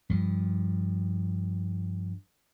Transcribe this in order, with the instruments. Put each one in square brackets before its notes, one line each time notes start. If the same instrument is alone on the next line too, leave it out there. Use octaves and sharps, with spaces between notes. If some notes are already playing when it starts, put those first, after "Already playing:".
[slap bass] G2 F3